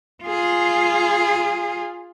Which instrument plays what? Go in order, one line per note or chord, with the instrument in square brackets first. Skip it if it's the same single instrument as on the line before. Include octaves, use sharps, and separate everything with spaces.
[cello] F4 G#4